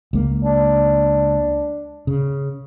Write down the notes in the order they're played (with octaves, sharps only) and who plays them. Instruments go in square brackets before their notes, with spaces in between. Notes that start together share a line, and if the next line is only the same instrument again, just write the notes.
[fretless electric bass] C#2 A#3
[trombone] D4
[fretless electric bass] C#3